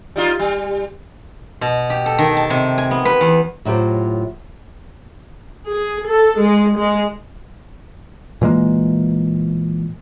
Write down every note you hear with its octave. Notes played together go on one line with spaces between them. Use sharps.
G3 D#4 F4
G3
B2
G4
A4
D#3
A5
C3
G#5
B3
B4
E2
A2 F#3 F4 G4 C5
G#4
A4
G#3
G#3
A#2 E3 G#3 A#3